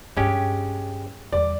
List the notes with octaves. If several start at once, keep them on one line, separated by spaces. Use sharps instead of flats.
G2 G#3 C#4 D4 G4
E2 G3 D5